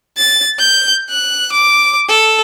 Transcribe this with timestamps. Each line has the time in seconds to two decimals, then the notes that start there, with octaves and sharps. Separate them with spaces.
0.18 A6
0.59 G6
1.10 F#6
1.53 D6
2.09 A4